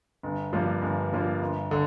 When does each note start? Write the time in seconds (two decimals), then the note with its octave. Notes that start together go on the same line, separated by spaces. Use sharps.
0.23 G1
0.53 G2 F3 A#3 F4
0.82 G1
1.12 G2 F3 A#3 F4
1.41 G1
1.71 D3